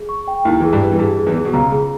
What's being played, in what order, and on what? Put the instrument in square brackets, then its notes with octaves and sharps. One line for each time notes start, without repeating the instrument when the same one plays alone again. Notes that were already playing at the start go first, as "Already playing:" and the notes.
Already playing: [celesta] G#4
C#6
G5
[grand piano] D#2 D#3 [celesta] E4
[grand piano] E3 [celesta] G#4
[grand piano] G2 G3
[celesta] B4
[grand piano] E3
[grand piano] G2 G3 [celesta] G#4
[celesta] G#4
[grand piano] E2 E3
[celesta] G#4
[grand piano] B2
[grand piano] C#2 C#3 [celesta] A#5
[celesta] G#4